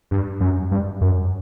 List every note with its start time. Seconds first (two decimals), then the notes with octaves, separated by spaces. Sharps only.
0.11 G2
0.41 F#2
0.71 G2
1.01 F#2